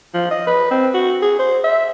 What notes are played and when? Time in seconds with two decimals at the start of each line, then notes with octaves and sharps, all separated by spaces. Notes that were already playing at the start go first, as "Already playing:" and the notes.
0.14 F3
0.31 D#5
0.47 B4
0.71 C4
0.94 F#4
1.22 G#4
1.39 C5
1.64 E5